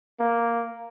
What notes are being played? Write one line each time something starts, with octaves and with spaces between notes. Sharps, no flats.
A#3